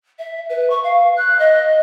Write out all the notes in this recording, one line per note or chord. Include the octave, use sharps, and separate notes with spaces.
E5
B4
C#6
F5
F#6
D#5